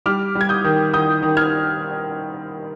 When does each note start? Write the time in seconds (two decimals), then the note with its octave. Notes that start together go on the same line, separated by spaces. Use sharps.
0.06 G3 D6 F6
0.35 G3
0.41 G#6
0.49 D#6 G6
0.64 D#3
0.93 D#3 D#6 G6
1.23 D#3
1.37 F6 G#6